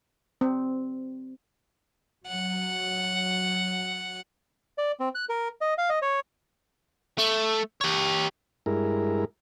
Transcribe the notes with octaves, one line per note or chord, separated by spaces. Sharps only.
C4
F#3 F#5
D5
C4
F#6
A#4
D#5
F5
D#5
C#5
A3
G4 C#5
G2 G#3 E4 A#4